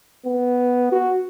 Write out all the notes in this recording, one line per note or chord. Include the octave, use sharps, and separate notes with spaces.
B3
F#4